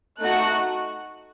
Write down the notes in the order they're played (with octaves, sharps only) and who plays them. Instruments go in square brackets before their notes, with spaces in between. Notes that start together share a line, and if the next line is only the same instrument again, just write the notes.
[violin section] A3 D#4 F#4 A4 F#6